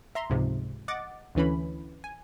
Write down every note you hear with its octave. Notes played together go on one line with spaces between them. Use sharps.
E5 A#5 C6
C#2 G#2 C3 F3 G#3
D#5 F#5 D6 A6
D2 D3 E3 C#4 B5
G#5